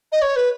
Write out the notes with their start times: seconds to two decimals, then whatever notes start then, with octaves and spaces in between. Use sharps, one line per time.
0.12 D#5
0.22 C#5
0.36 B4